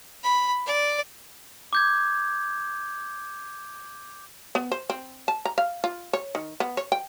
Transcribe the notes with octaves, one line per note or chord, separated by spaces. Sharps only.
B5
D5
D6 G6 G#6
B3
C5
C4
A5
A#5
F5
F4
C#5
D#3
B3
C#5
G5